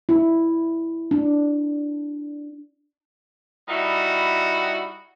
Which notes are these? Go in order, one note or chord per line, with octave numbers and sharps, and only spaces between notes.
E4
D4
G3 D#4 E4 F#4